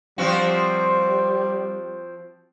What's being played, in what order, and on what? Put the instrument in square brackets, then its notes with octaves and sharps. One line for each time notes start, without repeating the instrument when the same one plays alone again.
[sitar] F3 C4 F#4 [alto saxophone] G3